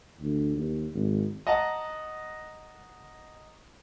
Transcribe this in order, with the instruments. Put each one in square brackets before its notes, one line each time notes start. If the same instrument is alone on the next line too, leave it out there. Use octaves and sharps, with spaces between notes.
[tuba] D2
D#2
G#1
[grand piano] D#5 F#5 A5 A#5